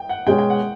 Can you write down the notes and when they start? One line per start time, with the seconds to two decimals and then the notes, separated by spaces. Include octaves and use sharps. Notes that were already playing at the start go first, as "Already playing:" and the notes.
Already playing: G5
0.09 F#5
0.26 B2 G#3 C#4 G5
0.38 G5
0.50 F#5